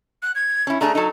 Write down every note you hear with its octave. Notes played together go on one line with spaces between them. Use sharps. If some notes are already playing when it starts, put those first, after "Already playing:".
F#6
G#6
C#4 E4
A3 D4 G#4 A#5
F#3 D#4 A4